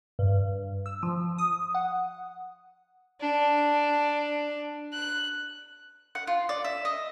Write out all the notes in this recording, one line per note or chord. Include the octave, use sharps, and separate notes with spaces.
G2
E6
F3
D#6
F#5
D4
F#6
F#5
F4
D5
E5
D#5